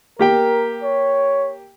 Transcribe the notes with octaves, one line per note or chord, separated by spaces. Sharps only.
A#3 G4 A#4 G5
C#5